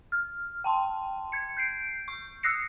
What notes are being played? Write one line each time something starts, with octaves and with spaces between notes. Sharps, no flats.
F6
G5 A5 C6
G#6 C#7
G6 C7 D7
C#6
D#6 E6 F#6 A#6 C7 C#7